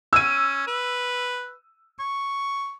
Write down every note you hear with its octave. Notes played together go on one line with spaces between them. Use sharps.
C#4 E6 D#7
B4
C#6